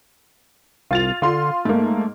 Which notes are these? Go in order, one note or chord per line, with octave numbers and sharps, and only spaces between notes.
C2 F4 A6 F7
D3 F4 C6
G#2 A3 A#3